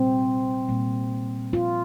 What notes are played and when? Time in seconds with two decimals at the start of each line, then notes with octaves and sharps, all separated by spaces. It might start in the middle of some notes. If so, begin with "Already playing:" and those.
Already playing: A#2 G3 C4
0.69 A#2 G3 A#3
1.53 F4